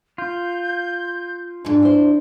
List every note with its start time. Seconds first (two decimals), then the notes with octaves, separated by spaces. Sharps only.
0.18 F4 G6
1.65 D#2 G#2 D4
1.82 E4 C5